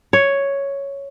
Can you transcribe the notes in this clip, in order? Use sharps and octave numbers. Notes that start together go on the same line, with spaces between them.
C#5